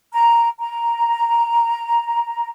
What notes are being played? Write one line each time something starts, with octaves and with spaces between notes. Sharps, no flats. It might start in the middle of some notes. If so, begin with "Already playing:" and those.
A#5
A#5